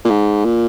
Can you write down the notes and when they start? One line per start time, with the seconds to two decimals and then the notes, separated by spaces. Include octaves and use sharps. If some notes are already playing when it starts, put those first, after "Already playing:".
0.05 A#2
0.10 G#2
0.45 A#2